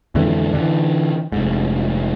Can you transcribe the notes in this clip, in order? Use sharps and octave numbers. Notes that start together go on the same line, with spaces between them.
F2 G#2 D3 E3
D3 E3
F1 G#2